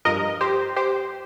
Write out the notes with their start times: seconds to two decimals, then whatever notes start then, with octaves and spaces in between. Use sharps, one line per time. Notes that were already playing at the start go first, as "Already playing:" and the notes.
0.05 G2 F3 A#4 D#5
0.41 G4 C5
0.76 G4 C5